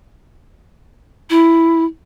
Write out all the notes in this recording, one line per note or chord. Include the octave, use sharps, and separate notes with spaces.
E4